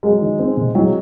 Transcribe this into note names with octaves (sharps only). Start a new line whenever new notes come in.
F#3 G#3
D#3
C4
C3
F#3 G#3